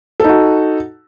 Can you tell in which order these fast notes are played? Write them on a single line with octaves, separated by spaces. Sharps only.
A4 D#4 F#4